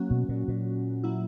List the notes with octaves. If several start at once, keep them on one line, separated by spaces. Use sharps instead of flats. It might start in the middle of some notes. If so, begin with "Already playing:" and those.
Already playing: F#3 A#3 C#4 F#4
B2
A#2
A#2
F#3 A#3 E4